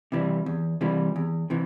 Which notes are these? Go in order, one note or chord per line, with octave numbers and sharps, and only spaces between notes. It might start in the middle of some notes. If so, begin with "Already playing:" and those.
C3 E3 G3
E2
C3 E3 G3
E2
C3 E3